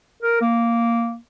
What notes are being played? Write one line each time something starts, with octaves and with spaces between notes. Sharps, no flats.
A#4
A#3